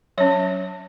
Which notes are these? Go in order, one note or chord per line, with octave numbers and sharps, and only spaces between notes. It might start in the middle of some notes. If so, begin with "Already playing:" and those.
F#3 C#4 C#5